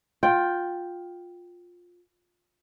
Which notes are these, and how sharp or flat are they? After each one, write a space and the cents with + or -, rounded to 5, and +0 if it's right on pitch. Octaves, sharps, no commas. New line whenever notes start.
F4 +15 G5 +0